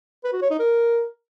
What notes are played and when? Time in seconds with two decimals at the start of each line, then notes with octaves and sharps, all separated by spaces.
0.24 B4
0.33 F#4
0.42 C#5
0.50 D#4
0.59 A#4